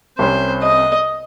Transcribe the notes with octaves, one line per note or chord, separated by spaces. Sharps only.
C2 C3 G3 C#4 C5
D#5